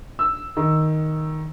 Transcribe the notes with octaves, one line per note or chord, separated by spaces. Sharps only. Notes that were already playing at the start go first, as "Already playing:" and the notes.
E6
D#3